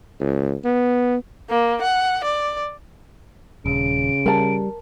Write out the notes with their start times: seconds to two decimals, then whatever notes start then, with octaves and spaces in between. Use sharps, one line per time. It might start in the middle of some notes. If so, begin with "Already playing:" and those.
0.20 C#2
0.64 B3
1.49 A#3
1.81 F#5
2.24 D5
3.66 D#1 C#3 D7
4.26 G3 A#4 A5